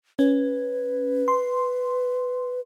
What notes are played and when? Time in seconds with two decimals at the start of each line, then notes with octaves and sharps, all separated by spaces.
0.19 C#4 B4
1.28 C6